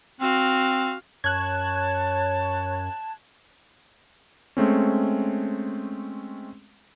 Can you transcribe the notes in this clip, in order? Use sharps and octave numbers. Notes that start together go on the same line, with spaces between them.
C4 F#4 F5
F#2 C#5 A5 F#6 G#6
G#3 A3 C4 C#4